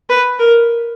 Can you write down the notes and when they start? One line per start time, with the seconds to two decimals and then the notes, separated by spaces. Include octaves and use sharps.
0.10 B4
0.39 A#4